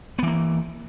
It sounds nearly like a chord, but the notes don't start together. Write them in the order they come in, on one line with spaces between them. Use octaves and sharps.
B3 E3 A#3